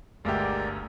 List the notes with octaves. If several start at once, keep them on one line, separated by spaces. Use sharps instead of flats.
G1 D2 G#3 G4 A#4 D5 E5